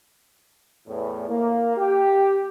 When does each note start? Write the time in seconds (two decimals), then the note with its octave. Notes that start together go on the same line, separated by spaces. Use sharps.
0.87 E2 A2
1.29 A#3
1.77 G4